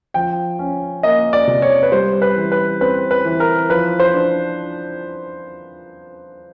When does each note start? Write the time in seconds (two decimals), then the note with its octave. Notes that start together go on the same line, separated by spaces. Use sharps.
0.14 F3 G5
0.59 C#4
1.03 A#3 D#5
1.33 D5
1.47 C3
1.62 C#5
1.83 B4
1.92 G3 C5
2.22 B4
2.36 E3
2.52 B4
2.81 C4 B4
3.11 B4
3.25 E3
3.40 A#4
3.70 F3 B4
4.00 C5
4.14 D4